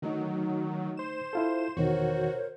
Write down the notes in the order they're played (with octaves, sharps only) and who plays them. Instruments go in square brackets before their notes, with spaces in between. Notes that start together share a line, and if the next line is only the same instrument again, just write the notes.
[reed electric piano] D3 A3 D#4 [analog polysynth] D#3 F#3
[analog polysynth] C5 E7
[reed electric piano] E4 F4 A4
[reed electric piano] E2 B2 D#3 [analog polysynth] F#4 [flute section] A#4 C5 C#5